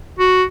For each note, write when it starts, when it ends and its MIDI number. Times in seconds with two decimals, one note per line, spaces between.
0.19 0.44 66